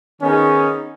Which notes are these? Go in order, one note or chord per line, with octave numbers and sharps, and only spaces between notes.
D#3 B3 C#4 D#4 G#4